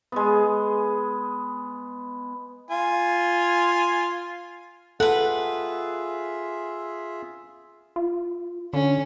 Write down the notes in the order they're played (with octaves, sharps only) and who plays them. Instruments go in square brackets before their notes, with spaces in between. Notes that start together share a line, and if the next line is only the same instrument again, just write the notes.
[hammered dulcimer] G#3 B3
[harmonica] F4 G#5
[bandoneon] F4 G#4 E5 [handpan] A4 [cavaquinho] B4 F#5
[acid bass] F4
[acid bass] D3 [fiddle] C#4